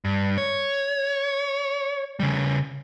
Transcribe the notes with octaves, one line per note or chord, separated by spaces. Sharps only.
G2
C#5
C#3 G3